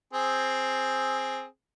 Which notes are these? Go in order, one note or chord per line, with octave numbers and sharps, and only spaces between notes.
C4 G#4